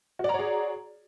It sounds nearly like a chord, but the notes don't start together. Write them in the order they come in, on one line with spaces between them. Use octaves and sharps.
F#4 D5 A#5 C#5 G#4